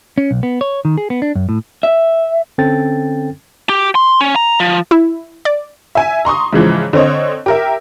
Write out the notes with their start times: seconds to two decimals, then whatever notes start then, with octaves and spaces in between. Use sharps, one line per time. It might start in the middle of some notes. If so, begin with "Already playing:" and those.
0.18 C#4
0.31 B1
0.43 B3
0.61 C#5
0.85 D#3
0.98 G#4
1.10 B3
1.22 D4
1.35 F#2
1.49 A2
1.83 E5
2.58 D3 C4 C#4 A4 G5 A6
3.69 G4
3.95 C6
4.21 C#4
4.36 A#5
4.60 F3
4.91 E4
5.45 D5
5.95 E5 G#5
6.25 A#5 C6 C#6 D#6
6.53 G#2 C#3 E3 F3
6.93 D3 C4 C5 C#5 D#5
7.46 G4 A#4 E5